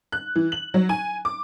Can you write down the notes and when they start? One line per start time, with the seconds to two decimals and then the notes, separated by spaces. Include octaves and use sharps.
0.12 F#6
0.35 E3
0.52 F#7
0.74 F#3
0.89 G#5
1.25 D6